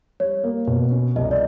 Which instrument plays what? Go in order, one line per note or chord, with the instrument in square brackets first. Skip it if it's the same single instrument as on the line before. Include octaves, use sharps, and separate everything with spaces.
[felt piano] G3 [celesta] C#5
[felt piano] A#3
B2
C#4
[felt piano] C2 [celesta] D#5
[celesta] D5